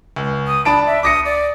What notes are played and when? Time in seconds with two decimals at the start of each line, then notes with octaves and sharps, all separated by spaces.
0.16 C#2
0.47 D#6
0.65 D4 A5 B5 D7
0.87 E5
1.03 D6 D#6 A#6 C#7
1.25 D5